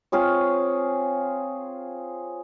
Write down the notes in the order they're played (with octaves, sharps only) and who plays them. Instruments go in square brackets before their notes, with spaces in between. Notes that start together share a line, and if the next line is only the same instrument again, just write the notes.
[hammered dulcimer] C4 F4 G#4 C#5